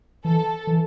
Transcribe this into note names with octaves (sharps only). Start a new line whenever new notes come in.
E3 A4
E3